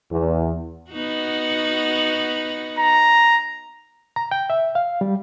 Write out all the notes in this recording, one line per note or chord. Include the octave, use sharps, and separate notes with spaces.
E2
B3 D#4 F#4
A#5
A#5
G5
E5
F5
G3